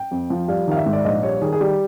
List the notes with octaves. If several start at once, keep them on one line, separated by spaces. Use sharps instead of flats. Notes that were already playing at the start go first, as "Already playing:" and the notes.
Already playing: G5
F2
F3
G3 F5
D#3 F5
E5
G#2
D5
A#1 D#5
G3 C#5
D#3 G#4
G#4
G3 G4